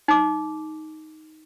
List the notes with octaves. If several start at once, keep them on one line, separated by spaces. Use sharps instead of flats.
D#4 D6